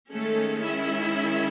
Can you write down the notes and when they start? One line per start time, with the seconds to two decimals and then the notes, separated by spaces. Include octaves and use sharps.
0.12 D#3 G#3 A3 C#4 A4
0.65 E4 E5